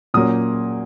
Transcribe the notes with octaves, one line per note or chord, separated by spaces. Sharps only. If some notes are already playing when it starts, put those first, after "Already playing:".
A#2 F#3 A#3 C#4 D#6